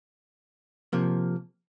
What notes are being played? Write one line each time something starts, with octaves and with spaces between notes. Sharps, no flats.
C3 F3 A#3